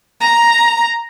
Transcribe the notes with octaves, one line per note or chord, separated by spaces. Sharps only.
A#5